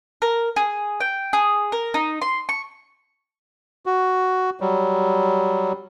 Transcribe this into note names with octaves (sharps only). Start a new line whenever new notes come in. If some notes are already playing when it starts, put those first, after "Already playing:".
A#4
G#4
G5
G#4
A#4
D#4
C6
C#6
F#4
F#3 G3